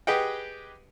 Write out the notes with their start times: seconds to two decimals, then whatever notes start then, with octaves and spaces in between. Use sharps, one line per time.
0.07 G4 G#4 B4 D#5 F#5 G5